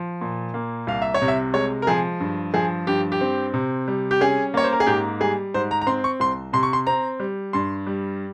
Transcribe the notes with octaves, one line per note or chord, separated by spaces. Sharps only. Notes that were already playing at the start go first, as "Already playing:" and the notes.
Already playing: F3
A#2
A#3
C2 F5
E5
C#5
C3
E5
G#3 C#5
A#4
F3 G#4
G2
F3 G#4
G2 G4
G4
C4
C3
G3
G4
C#4 G#4
A#3 C#5
C5
A#4
G#4
G#2 G4
G3 G#4
G#2 C5
A#5
A#5
C4 C6
C#6
C2 C6
C3 C6
C#6
C6
C4 A#5
G3
G2 C6
G3